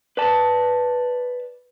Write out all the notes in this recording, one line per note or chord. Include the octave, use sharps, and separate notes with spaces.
B4 D5 A5